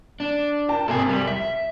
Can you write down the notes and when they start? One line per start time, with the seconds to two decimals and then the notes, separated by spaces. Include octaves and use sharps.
0.20 D4
0.68 A#4 G5 A5
0.88 G#1 C3 A4 G#5
1.09 G3
1.28 E5 B6